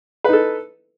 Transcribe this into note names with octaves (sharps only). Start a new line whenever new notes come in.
D#4 A4 B4